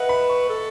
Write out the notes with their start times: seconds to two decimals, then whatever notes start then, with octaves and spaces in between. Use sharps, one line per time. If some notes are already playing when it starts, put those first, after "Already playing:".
Already playing: B4 D#5 E5 F#5
0.09 B5
0.30 C#6
0.49 A4